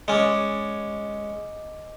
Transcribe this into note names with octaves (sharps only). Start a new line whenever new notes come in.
G#3 C#4 D#5 G#5 D6